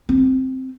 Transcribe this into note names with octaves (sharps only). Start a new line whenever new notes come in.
C4